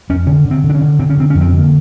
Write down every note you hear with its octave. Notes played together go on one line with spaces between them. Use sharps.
F2 C#4
D3 C#4
D3
C4
D3
D4
C#4
D3
D3 C4
C#4
D3 C4
F2 C#4
C4
D3
A#3